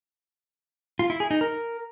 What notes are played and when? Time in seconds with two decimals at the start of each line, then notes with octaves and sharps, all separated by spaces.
0.99 F4
1.10 E4
1.20 G#4
1.31 D#4
1.41 A#4